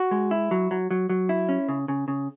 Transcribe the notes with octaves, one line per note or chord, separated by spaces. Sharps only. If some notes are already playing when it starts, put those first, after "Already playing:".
Already playing: F#4
G#3
E4
F#3
F#3
F#3
F#3
E4
C#4
C#3
C#3
C#3